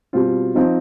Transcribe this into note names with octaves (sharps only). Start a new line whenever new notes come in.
B2 G3 C4 F4
F3 C4 D#4